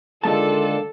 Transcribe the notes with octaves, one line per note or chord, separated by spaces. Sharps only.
D3 D#3 G#3 F4 A4 D5 A5